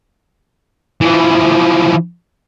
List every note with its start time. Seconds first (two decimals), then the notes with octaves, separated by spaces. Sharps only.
1.01 E3 F3